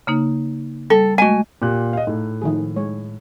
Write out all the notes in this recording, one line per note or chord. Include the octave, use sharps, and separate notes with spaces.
C#3 A#3 D#4
G3 A4
G#3 A3 F#4 D#5 G#5
A#2 G4 F#6
D#5 F5
A2 D#4 G#4
D#3 F3 G#4
G#3 C#5